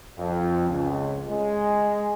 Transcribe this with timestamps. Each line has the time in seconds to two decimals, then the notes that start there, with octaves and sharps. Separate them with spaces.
0.17 F2
0.69 C#2
1.29 G#3